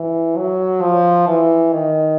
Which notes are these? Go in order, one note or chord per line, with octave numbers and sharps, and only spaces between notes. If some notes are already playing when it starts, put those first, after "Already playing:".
Already playing: E3
F#3
F3
E3
D#3